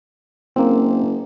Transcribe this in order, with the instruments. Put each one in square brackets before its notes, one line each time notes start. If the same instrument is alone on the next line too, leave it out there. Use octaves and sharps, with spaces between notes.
[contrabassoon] F#1 [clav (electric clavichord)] A#3 C4